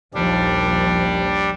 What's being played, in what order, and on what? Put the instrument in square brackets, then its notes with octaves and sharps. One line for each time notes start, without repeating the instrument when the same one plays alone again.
[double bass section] A#1 D#2 F3 [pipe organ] G3 D4